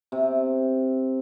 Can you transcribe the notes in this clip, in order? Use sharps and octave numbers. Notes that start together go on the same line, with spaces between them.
C3